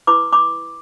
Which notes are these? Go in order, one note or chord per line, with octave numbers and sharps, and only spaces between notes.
E4 B4 B5 D6
B5 D6